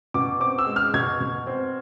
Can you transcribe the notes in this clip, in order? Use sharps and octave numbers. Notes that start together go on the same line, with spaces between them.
B2 D6
C4 D6
E6
G#3
F6
B2 G#6
B2
C4